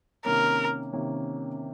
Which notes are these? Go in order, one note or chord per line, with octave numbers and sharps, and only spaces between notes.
C3 D#3 A#3 C#4 A#4
C3 D#3 A#3 C#4